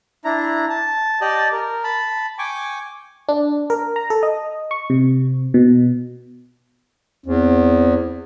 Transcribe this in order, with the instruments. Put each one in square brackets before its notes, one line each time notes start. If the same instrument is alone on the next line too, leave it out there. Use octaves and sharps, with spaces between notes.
[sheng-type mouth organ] D4 E4 A#5
A5
G4 D5 D#5 A5
A#4
A5 B5
G5 G#5 C#6 D6
[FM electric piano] D4
A#4
A#5
A4
D#5
C#6
C3
B2
[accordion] E2 [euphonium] C4